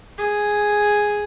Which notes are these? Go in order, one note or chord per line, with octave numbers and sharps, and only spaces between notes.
G#4